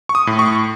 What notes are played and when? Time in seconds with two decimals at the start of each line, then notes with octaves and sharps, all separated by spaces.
0.09 C#6
0.15 D#6
0.27 A2
0.39 C#6